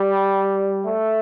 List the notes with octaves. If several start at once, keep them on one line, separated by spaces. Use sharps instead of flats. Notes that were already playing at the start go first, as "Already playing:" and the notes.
Already playing: G3
A3